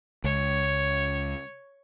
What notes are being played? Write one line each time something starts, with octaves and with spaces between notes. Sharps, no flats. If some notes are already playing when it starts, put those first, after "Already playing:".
C#2 C#5